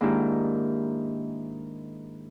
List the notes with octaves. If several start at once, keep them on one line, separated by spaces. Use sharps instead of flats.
G#2 D#3 A#3 D4 E4 G4